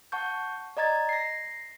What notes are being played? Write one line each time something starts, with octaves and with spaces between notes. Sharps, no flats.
F#5 A5 C#6 G6
D5 D#5 A#5 G#6 A6
A#6 C7